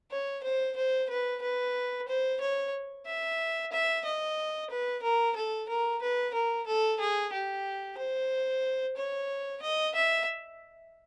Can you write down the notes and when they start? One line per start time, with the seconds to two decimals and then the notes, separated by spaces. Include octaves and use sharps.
0.11 C#5
0.43 C5
0.77 C5
1.10 B4
1.42 B4
2.08 C5
2.41 C#5
3.06 E5
3.72 E5
4.05 D#5
4.70 B4
5.03 A#4
5.36 A4
5.69 A#4
6.02 B4
6.34 A#4
6.67 A4
7.00 G#4
7.33 G4
7.98 C5
8.97 C#5
9.62 D#5
9.95 E5